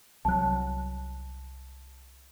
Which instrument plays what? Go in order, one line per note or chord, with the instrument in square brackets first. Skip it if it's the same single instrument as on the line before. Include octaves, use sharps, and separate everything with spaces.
[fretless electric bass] C2 F#3 [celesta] A5 F#6